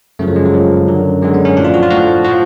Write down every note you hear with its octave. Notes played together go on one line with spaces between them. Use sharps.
F#2 C#3 F3 A3
F#3
G#3
F#3
F#2 C#3 F3
F#2 D3 F#3
F#2 D3 F#3 G#3
B3
C#4
A2 F3 D4
F4
F#4
F4
A2 F3 F#4
F3 F#4